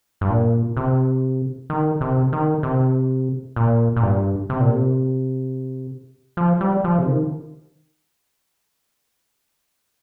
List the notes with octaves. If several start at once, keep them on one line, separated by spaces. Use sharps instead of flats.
G2
A#2
C3
D#3
C3
D#3
C3
A#2
A#2
G2
C3
A#2
C3
F3
G3
F3
C3
D#3